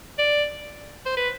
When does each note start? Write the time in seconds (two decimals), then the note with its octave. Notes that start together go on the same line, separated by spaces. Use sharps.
0.19 D5
1.06 C5
1.17 B4